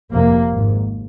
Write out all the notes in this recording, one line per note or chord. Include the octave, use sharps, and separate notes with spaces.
F1 F2 C3 A#3
G#1 G#2